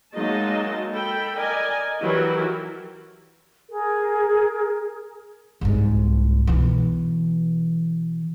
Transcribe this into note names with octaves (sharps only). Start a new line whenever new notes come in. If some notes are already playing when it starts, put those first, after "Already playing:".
F#3 G#3 A#3 D#4 D#5 A5
A4 G5 B5
A#4 D5 D#5 G#5
E3 F#3 E4 G4 A#4
G#4 A#4
C2 G#2
B2 E3